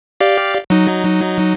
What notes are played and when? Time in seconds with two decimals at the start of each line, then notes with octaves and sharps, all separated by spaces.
0.20 G4 D5 F5
0.70 F#3 D#4